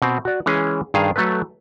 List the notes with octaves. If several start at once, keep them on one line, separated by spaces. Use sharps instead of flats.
B2 C4
F#4 D5
E3 G#3 C#4 G#4
G2 D#3 G#4 F5
F#3 A3 A4 B4